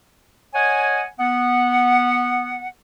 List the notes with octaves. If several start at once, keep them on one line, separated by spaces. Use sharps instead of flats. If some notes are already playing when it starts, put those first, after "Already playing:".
C#5 D#5 F#5 G#5
B3 F#5